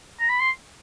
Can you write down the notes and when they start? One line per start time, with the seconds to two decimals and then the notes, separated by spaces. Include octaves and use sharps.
0.20 A#5
0.29 B5
0.40 C6